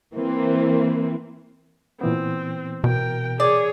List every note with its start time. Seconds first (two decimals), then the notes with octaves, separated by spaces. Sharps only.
0.14 E3 A#3 C4
2.01 A#2 E3 B3 C4
2.84 B2 A#4 G5
3.40 G#4 C#5 D5